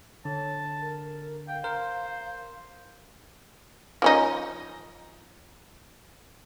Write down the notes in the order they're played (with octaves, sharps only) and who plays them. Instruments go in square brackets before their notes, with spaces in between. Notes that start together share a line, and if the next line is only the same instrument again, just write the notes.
[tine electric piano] D3 [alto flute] C#5 [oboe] A5
[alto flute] A#4
[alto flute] F5 [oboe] G5
[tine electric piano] A#4 [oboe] C5
[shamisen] F3 C#4 D#4